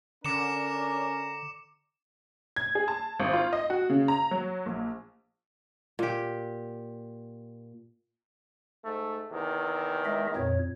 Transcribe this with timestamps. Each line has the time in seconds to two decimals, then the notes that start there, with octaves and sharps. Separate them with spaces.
0.25 D3 C#4 D4 A#4 A#5 D6 C#7 E7
2.56 G#6
2.75 G#4
2.88 A5
3.20 G#1
3.33 F4
3.53 D#5
3.70 F#4
3.89 C#3
4.08 A#5
4.31 F#3
4.66 A#1
5.99 A#2 G4
8.85 G#2 A3
9.32 E2 C3 D#3
10.05 G#3 D#5 E5
10.36 F2 A#2 C#5